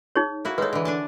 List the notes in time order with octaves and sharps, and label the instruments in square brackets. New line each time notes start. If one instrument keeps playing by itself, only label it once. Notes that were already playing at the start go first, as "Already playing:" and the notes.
[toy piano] D#4 G#4 C#5
[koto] A#3 E4 F#4
[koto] G#3 A4 [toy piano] B4 C#5
[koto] D3 E3
D4 G#5 A5